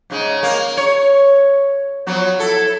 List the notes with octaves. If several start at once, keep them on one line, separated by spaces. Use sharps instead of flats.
G#2 C#3 G#3
A#3
C#5
F3 F#3 B3
E4 A4